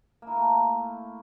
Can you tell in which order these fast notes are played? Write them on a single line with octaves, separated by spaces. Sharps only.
A#3 E4 A#4 A3